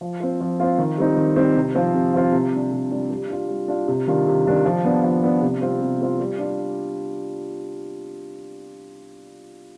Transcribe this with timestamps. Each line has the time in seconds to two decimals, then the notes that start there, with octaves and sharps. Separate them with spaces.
0.01 F3
0.20 C4 F4
0.41 F3
0.60 C4 F4
0.78 D#3
0.98 G3 C4 D#4
1.17 D#3
1.36 G3 C4 D#4
1.56 C3
1.75 F3 C4 F4
1.95 C3
2.14 F3 C4 F4
2.33 C3
2.52 G3 D4
2.72 C3
2.91 G3 D4
3.11 G3
3.29 D4 F4
3.49 G3
3.68 D4 F4
3.88 C3
4.07 D#3 G3 D4 F4
4.27 C3
4.46 D#3 G3 D4 F4
4.66 F3
4.85 B3 D4
5.04 F3
5.23 B3 D4
5.42 C3
5.61 G3 C4 F4
5.81 C3
6.01 G3 C4 F4
6.20 G3
6.39 D4 F4